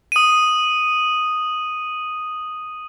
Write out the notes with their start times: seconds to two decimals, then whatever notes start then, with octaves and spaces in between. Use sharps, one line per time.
0.12 D#6 D#7